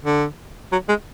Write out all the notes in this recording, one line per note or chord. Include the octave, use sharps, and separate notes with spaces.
D3
F#3
G#3